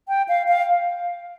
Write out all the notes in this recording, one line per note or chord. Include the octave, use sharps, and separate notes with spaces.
G5
F5
F5